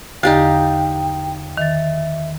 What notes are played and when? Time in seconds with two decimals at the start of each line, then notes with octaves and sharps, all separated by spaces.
0.23 E2 D3 D#4 G4 F5 G5 A6
1.57 D#3 E5 A6